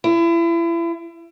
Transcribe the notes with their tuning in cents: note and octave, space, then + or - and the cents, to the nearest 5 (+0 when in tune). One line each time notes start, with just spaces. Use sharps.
E4 +35